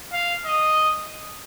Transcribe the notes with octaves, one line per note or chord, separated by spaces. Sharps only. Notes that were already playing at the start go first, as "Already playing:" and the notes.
F5
D#5